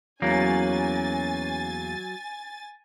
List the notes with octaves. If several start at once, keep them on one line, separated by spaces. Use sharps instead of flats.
E2 F#3 A#3 C#4 G#5 A6